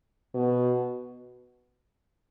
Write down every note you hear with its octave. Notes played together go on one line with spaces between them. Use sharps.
B2